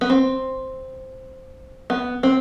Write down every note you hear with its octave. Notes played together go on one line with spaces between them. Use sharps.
B3
C4
B3
C4